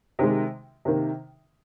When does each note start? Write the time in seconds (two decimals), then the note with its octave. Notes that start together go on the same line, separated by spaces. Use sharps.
0.19 C3 D#3 G#3
0.85 C3 D#3 A#3